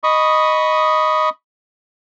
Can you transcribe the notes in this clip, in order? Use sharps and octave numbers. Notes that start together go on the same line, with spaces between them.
D#5 B5 C#6 D#6